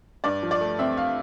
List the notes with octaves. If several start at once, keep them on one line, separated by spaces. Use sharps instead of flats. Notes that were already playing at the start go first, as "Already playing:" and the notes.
G2 D5
F3
D5
A3
C4 E5
F5